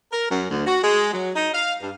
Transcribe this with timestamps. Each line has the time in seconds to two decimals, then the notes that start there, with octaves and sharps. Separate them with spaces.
0.12 A#4
0.30 F#2
0.50 D2
0.66 F#4
0.82 G#3
1.13 F#3
1.36 D#4
1.53 F5
1.81 G2